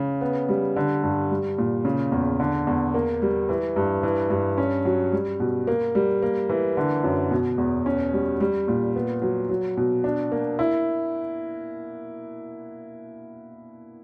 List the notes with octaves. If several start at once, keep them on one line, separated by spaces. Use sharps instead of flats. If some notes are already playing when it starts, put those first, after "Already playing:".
Already playing: C#3
B3
G3
D3
G2
G3
A#2
C#3
E2
D3
E2
A#3
G3
E3
G2
E3
G2
C#4
F#3
G3
B2
A#3
G3
A#3
E3
D3
F#2
B2
E2
C#4
G3
G3
A#2
B3
F#3
F#3
B2
D4
A#3
E4